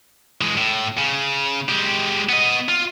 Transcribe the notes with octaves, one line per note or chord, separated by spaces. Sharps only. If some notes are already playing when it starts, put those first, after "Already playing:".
E3 G#3
A2
C#3
G#3 G4
B3 D#5
F4